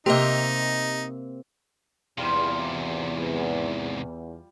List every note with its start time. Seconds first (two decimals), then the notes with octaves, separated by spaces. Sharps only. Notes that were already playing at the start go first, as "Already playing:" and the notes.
0.06 C3 A#3 C4 D#4 G4 D#5
2.18 E2 G#2 C3 G3 F4